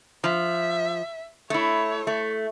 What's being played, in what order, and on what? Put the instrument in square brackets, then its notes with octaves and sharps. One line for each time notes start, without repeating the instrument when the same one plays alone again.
[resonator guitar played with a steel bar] F3 [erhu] E5
[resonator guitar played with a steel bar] A3 E4 [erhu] C#5
[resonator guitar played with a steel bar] A3